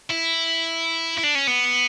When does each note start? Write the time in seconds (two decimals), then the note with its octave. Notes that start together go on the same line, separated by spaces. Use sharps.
0.10 E4
1.18 E4
1.23 D4
1.35 C#4
1.47 B3